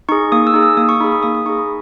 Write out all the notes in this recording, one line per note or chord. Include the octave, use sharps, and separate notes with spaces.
D#4 G#4 C#6
A#3 D#6
E6
D#4 G#4
E6
A#3 D#6
C#6
D#4 G#4 B5
D#6
A#3 D#6
D#6
D#4 G#4 C#6
B5